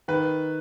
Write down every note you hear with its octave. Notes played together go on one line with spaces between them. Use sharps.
D#3 B4